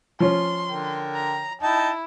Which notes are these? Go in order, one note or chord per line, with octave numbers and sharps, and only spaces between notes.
F3 C#4 C6
D3 A#4 G5
A#5
D#4 E4 G5 A5